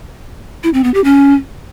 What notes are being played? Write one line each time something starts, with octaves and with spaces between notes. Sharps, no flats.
E4
C4
B3
G4
C#4